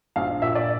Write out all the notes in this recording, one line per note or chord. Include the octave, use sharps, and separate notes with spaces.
A#1 F5
A#2 E5
D5